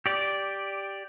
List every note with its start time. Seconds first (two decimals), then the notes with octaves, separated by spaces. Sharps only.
0.06 G4 D5